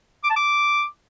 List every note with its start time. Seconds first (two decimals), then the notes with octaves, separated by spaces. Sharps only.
0.24 D6
0.30 A5
0.36 D6